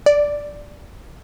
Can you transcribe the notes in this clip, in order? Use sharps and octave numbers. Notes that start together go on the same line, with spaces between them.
D5